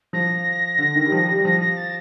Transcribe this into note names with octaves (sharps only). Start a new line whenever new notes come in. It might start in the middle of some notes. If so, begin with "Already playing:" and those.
F3 A#6
D3
D#3
G3
F3
G3
F3 A#6
A#6
A6